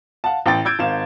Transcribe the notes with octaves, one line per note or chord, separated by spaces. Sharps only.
F5 F#5 A5
A1 G5 A6
E6 G6 G#6 D7
G#1 F5 E7